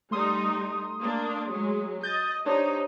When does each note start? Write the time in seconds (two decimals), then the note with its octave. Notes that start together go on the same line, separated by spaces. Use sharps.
0.11 G3 A3 D#4 C6 D#6
1.01 A#3 D4
1.51 F#3 G#3
2.03 D#5 G6 A6
2.46 D4 D#4 G4 C5 C#5